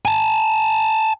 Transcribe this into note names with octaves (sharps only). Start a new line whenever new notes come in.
G#5 A5